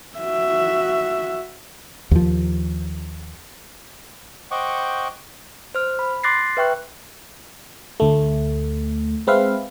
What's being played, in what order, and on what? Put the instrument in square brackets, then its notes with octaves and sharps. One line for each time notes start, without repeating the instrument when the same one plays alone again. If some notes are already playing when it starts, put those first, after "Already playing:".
[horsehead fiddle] F#4 E5
[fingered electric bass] D#2 F3
[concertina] C5 D#5 F#5 G5 C#6 D6
[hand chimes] C5 F6
B5
C6 D6 F#6 A6 A#6 C7
B4 E5 G5 C#6 F#6
[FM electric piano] D2 A3
G#3 C4 B4 E5 F5